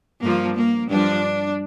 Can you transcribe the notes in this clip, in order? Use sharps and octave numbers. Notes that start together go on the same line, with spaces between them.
G2 F3 A#3
A#3
G2 F3 D4